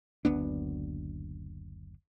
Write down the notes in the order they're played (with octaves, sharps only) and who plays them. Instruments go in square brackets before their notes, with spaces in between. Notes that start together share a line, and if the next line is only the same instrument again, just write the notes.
[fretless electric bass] F#1 D2 B3 D4